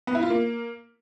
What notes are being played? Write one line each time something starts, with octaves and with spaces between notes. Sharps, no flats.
B3
E4
F4
A#3